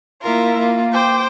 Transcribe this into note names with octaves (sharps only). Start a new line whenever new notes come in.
A#3 E4 F4 A#4
A#3 F4
C5 G5 D6